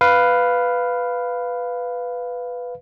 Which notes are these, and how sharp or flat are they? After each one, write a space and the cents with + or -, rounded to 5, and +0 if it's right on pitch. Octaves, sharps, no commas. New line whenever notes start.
B4 +5 F5 +0